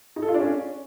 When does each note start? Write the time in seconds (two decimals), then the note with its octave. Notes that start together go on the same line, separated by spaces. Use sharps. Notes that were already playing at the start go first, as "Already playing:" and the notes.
0.16 D#4
0.22 A4
0.28 F4
0.34 D4
0.40 C#4